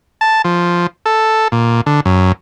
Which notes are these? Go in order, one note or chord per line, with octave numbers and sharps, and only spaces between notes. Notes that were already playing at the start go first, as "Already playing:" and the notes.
A5
F3
A4
A#2
D3
F#2